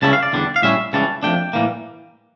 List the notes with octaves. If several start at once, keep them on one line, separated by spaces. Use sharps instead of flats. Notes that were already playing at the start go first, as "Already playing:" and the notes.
C#2 C#3 G3 C#4 E4 A5
F5
D5
E2 D3 G3 D4
F5
A2 G3 C#4 E4 E5
C#2 C#3 E3 G3 A5
F2 E3 A3 D4 G5
A2 E3 G3 A#3